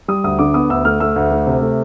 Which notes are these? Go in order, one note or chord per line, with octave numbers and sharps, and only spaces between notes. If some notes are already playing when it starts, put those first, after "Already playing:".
G3 D#6
D2 D#6
D3 D6
B3 D#6
D2 E6
A3 F6
A3 E6
D2
A3
C3
A3